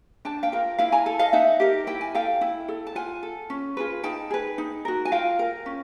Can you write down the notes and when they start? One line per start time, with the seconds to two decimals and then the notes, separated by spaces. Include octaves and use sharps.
0.25 D4 G5 A5
0.43 F5 G5
0.52 F4 A#4
0.78 E4 F5 G5
0.92 G#5 A#5
1.06 A4
1.19 D#5 F5
1.33 D#4 E5 F#5
1.60 G4 A#4
1.87 E4 G5
2.01 G#5
2.15 A4 F5 G5
2.41 E4
2.68 A4
2.87 A5
2.95 F4 F#5 G#5
3.23 A4
3.50 C#4
3.77 F4 G#4 B4
4.04 D#4 G5 A5
4.31 G#4 B4
4.58 D#4
4.85 F#4 A#4
5.05 G#5
5.12 F4 F5 G5
5.39 A#4
5.66 C#4